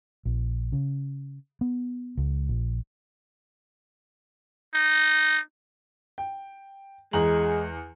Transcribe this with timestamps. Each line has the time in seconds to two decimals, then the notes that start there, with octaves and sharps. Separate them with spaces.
0.26 A#1
0.72 C#3
1.61 B3
2.17 C#2
2.49 A#1
4.75 D#4
6.18 G5
7.13 E2 G#3 A#5 F#7